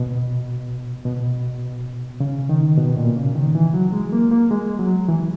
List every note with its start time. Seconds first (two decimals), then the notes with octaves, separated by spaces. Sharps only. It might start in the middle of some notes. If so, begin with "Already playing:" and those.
Already playing: B2
1.05 B2
2.20 C#3
2.49 D#3
2.78 B2
2.97 A#2
3.16 C#3
3.35 D#3
3.55 E3
3.74 F#3
3.92 G#3
4.12 A#3
4.32 A#3
4.51 G#3
4.79 F#3
5.09 E3